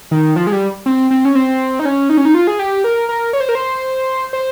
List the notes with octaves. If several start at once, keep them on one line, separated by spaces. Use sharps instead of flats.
D#3
F3
G#3
G3
C4
C4
C#4
C4
D#4
C#4
D#4
C#4
D#4
F4
G#4
G4
A#4
A#4
C#5
C5
A#4
C5
C5